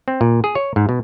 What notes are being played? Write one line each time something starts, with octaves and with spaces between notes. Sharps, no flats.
C4
A#2
G#4
C#5
G#2
B2